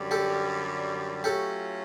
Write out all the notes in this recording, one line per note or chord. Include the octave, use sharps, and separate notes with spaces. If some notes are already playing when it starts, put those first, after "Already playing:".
Already playing: F#2 D3 G3
G4 A4
F#3 A3 C#4 F4 G4 A4